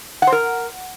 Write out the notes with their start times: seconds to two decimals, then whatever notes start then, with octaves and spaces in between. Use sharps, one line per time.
0.22 F#5
0.27 C5
0.32 A#4